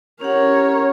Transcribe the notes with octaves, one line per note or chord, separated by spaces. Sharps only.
C#4 G4 A#4 C#5 F#5